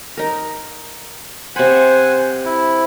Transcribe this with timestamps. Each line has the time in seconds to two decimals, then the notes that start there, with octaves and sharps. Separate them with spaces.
0.17 D#4 A#4
1.56 C3 C5 F#5 G#5 B5
2.45 E4